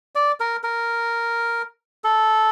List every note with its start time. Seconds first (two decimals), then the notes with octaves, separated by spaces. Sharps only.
0.15 D5
0.40 A#4
0.63 A#4
2.04 A4